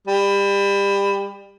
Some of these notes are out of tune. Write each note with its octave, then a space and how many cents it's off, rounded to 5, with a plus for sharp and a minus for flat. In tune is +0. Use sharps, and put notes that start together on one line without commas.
G3 +25